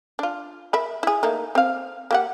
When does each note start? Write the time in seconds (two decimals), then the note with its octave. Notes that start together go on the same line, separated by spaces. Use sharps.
0.19 D4 F4
0.73 A#4 E5 B5
1.03 E4 G#4
1.23 A3 A#3 D#4
1.55 C4 F5
2.11 A#3 G4 F#5